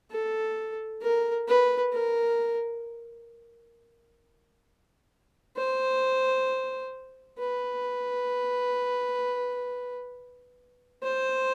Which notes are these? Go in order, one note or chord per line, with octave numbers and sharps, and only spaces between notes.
A4
A#4
B4
A#4
C5
B4
C5